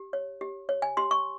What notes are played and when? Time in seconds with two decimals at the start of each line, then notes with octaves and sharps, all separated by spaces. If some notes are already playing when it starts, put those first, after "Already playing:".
Already playing: G4
0.13 C#5
0.41 G4
0.69 C#5
0.82 G#5
0.97 G4 C6
1.11 C#6